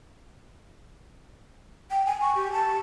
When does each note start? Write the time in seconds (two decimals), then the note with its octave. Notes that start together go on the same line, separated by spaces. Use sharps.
1.91 G5
2.06 G#5
2.21 C#6
2.35 G4
2.52 A5